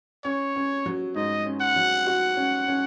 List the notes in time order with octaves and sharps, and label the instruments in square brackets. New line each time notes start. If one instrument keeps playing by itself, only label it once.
[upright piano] C#4 [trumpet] C#5
[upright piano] C#4
F#3
[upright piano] G#2 [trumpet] D#5
[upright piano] C#4
[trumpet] F#5
[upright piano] F#3
F#4
C#4
C#4